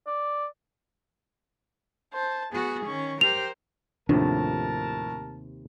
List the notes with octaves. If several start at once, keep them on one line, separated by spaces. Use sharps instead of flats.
D5
C5 A5
B3 F#4 G#4
D#3 C#4 C#6
G4 A#4 C5 G5 F7
D#2 A2 C3 F3 D4 A#4 A5